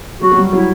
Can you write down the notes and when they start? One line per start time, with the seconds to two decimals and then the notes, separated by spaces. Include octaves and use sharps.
0.21 F#3 F#4
0.32 F#3
0.37 G3
0.53 F#3 E4